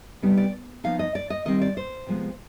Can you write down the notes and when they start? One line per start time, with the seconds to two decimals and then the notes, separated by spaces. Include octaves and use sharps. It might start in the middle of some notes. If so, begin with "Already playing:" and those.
0.22 C3 G3 B3 D#4
0.37 D5
0.84 F3 B3 D#4 F5
0.99 D#5
1.15 D5
1.30 D#5
1.45 D#3 G3 C4 D#5
1.62 D5
1.77 C5
2.06 C3 F3 G#3 B3